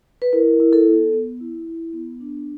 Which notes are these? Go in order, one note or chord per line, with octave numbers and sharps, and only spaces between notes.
B4
E4 A#4
E4
A4
B3
B3
E4
E4
B3
D4